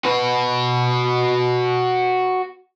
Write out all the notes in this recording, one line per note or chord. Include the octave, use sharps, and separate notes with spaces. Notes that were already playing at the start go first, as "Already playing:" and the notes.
F#4 B4